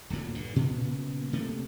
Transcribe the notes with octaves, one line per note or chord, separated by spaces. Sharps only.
D1 D2 A#2 F#3
G2 D3
A#2 C#3 F#3 B3
C3 A3 A#3